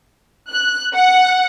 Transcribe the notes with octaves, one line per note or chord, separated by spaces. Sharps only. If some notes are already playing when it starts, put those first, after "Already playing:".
F#6
F#5